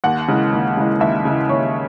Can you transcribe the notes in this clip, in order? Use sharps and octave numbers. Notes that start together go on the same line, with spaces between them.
D#2 F#5
C#3 E3 G#3
D#2
C#3 E3 G#3
D#2 E5
C#3 E3 G#3
D#2 C#5